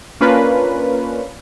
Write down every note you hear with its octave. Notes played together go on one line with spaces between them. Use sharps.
A#3 C#4 D4 F4 A#4 B4